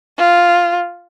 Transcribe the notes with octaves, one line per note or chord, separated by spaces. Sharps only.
F4